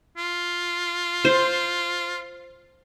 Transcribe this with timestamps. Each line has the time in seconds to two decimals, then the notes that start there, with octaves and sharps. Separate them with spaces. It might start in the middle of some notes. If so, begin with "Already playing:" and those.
0.17 F4
1.25 C5